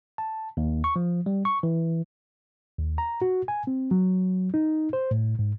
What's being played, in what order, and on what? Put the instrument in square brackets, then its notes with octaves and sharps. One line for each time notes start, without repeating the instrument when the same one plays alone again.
[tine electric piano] A5
D#2
C#6
F3
G3
C#6
E3
[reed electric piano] D#2
A#5
F#4
G#5
C4
F#3
D#4
C5
A2
G#2